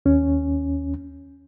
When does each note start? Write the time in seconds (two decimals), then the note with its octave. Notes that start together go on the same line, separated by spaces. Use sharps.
0.06 D#2 C#4